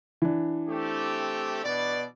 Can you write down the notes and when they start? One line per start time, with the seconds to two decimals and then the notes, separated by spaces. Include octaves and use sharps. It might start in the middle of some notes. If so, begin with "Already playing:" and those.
0.22 E3 D4
0.68 A3 C4 G4
1.63 B2 B4 D5